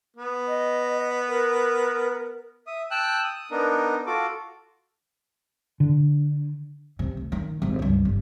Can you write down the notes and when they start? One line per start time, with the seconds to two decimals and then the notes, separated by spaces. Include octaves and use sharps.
0.17 B3
0.48 D#5
1.29 A#4
2.67 E5 D#6
2.91 G5 A5 E6 F#6
3.24 D#6
3.51 B3 D4 D#4 A#4
4.07 F4 F#4 A4 D6
5.80 D3
6.99 C3
7.17 D2
7.32 D#3
7.62 G#1 C3
7.79 C#2 G2
8.05 G1